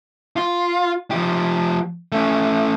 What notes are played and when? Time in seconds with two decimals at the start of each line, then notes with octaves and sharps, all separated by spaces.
0.36 F4
1.11 F3 G4
2.12 A3 C#4